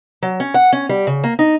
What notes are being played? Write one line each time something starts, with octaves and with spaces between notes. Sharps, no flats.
F#3
C#4
F#5
C#4
G3
C#3
A#3
D#4